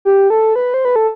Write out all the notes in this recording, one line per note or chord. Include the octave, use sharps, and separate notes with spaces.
G4
A4
B4
C5
B4
A4